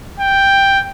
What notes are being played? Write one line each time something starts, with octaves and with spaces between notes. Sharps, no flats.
G5